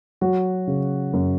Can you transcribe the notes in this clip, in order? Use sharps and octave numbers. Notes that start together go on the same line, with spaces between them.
F#3 F#4
C#3
F#2